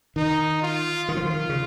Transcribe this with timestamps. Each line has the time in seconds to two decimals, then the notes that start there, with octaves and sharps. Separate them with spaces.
0.16 D#3 D#4
0.62 F4
1.09 D#3 F4
1.17 F3
1.25 D#3
1.49 C#3